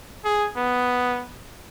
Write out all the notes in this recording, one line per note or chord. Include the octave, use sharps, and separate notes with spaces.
G#4
B3